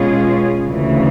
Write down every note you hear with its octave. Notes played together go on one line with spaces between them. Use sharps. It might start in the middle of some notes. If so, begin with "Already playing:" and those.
Already playing: B2 G#3 C#4 F4 G#4
D2 C#3 E3